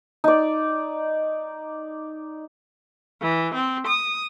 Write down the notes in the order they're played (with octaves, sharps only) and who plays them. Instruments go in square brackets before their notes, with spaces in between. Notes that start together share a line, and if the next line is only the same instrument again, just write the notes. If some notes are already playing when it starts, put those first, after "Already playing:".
[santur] D#4 D5
[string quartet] E3
C4
D#6